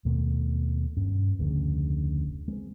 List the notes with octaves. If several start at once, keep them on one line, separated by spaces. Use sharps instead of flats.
D#2 B2 A3 C4
G2 C#4
F1 D2 C#3
G#3 C4